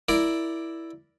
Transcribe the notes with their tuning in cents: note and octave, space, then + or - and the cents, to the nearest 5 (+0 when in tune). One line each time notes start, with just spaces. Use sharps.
E4 +0 A#4 +0 D5 +0